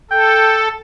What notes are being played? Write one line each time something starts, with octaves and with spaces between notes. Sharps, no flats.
A4 G5